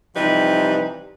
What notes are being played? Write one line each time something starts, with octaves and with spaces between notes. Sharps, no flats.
C3 E3 F3 G3 D#4 B4